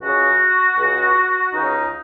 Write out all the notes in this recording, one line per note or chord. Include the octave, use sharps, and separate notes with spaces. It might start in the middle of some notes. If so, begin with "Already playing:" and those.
C#2 C#3 F#4
C#2 C#3
C#2 C#3 D#4